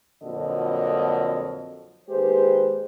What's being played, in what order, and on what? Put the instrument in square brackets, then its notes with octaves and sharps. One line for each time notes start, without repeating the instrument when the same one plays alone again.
[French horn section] F2 A#2 D3 F#3 F#4 D#5
D#2 G#3 G4 B4 C5